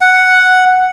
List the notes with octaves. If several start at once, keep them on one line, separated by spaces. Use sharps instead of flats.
F#5